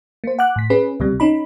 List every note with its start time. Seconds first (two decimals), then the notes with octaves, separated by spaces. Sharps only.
0.24 A#3 C5
0.39 F#5 D6 F#6
0.56 A2 B6
0.70 C#4 G#4 B4
1.00 C#2 C3 G3
1.20 C#4 D#4 B5